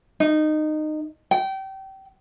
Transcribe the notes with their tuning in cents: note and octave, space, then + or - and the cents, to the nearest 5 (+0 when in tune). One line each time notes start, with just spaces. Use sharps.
D#4 -20
G5 -25